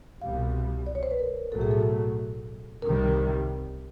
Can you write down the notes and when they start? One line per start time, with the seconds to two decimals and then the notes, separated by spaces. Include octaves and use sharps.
0.22 C2 B2 G3 F5
0.86 D5
0.95 C#5
1.03 C5
1.11 B4
1.19 A#4
1.52 B1 A2 F#3 A3 A4
1.61 G#4
1.71 A4
2.82 C2 C3 D#3 G3 A#4